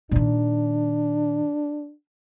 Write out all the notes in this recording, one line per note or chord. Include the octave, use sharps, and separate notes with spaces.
A#2 D#3 D4